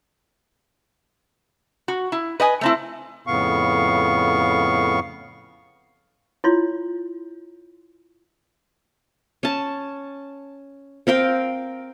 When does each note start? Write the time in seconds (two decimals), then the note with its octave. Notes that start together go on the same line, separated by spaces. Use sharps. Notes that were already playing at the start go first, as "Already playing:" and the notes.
1.88 F#4
2.12 E4
2.40 B4 D#5 G#5
2.61 A3 C4 E4
3.27 F2 A2 C#3 B3 F5 C#6
6.44 E4 F4 C#5 C6
9.43 C#4 A5
11.07 C4 A#4 F5 G5